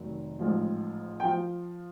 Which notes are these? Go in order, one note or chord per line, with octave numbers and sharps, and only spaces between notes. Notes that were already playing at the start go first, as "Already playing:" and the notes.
Already playing: F1 D#3 F#3
A1 G#2 F3
G5
F3